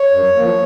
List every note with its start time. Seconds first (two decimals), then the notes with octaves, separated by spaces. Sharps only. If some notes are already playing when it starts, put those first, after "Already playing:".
Already playing: C#5
0.11 F#2
0.36 F3 A#3